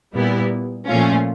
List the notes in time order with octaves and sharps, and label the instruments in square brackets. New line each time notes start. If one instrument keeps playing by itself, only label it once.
[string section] A#2 G3 B3 E4
A#2 F3 A3 C#4 F4